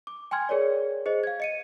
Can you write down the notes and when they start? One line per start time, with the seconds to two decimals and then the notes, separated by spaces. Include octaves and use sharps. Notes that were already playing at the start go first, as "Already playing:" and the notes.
0.07 D6
0.31 G5 G#5 C6 F6 G#6
0.49 G#4 A#4 C#5 D5
1.06 G#4 C5 D#5
1.24 F5 G#6
1.40 D#5 C#7 D#7